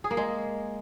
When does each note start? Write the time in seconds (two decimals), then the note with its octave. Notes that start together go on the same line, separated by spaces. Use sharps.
0.04 G#4
0.11 A#3
0.17 G#3